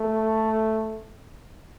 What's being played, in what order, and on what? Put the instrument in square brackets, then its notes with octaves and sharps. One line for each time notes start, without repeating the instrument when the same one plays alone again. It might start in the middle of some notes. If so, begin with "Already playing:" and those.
Already playing: [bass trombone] A3